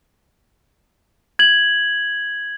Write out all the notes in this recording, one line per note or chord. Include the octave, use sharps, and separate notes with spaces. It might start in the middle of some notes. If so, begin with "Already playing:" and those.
G#6 F#7